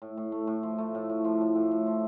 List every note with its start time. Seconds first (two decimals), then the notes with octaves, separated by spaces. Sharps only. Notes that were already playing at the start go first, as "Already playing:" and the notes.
0.02 A2
0.17 A2
0.32 A3
0.47 A2
0.63 F3
0.78 A3
0.95 A2
1.10 A2
1.24 F3
1.41 A2
1.55 A2
1.71 A2
1.87 F3